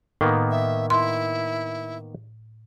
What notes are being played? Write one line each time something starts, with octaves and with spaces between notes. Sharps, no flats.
A2 D#3 A#3 B3
E5
E4 C6